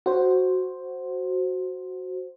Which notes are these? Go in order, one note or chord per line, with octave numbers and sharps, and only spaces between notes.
F#4 C5